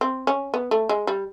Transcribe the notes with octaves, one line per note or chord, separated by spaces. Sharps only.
C4
C#4
B3
A3
G#3
G3